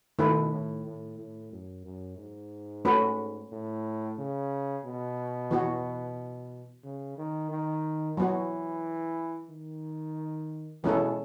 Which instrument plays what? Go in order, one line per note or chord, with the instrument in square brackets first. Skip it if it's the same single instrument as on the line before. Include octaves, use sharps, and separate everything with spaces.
[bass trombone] B2 [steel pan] D#3 A3 E4 B4
[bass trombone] A2
A2
A2
F#2
F#2
G#2
[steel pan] A3 C#4 F#4 B4
[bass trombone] A2
C#3
B2
[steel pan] E3 B3 F#4
[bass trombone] C#3
D#3
D#3
[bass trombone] E3 [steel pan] F#3 B3 F#4
[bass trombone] D#3
[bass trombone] B2 [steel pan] E3 G#3 C#4 E4 A4